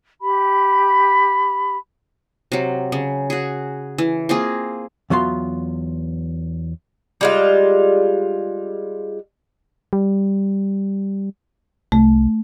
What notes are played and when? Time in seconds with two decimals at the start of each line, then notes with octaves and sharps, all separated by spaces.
0.21 G4 B5
2.52 C3 F#3
2.92 C#3
3.30 F#4 G#4
3.98 E3
4.29 A#3 C4 F4 G#4
5.10 E2 F#3 B3 F4 C6
7.21 G3 G#3 F4
9.93 G3
11.92 C2 A3